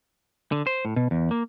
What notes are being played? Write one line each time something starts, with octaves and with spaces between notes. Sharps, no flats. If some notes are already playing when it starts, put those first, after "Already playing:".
D3
C5
A2
B2
E2
A#3